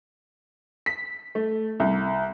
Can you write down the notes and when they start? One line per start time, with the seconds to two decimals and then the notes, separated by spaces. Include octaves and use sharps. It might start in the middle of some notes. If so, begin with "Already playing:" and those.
0.86 B6
1.35 A3
1.80 C2